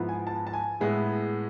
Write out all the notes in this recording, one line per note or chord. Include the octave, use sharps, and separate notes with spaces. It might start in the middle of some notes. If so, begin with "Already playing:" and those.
Already playing: G#2 F3 B3 E4
G#5
A5
A5
G#5
A2 G#3 B3 E4